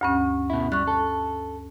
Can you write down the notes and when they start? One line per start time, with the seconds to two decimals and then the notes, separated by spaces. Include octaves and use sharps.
0.01 D2 G2 C#4
0.50 B2 E4
0.72 G3 C#6 F#6
0.87 A4